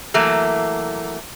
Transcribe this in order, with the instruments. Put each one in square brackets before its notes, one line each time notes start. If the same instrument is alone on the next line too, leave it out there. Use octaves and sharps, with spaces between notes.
[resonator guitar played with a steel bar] E3 F#3 A3 A#3